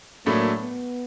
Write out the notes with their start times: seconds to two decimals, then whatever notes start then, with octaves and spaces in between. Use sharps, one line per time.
0.26 A2 F#3 A3 A#3 D4
0.61 B3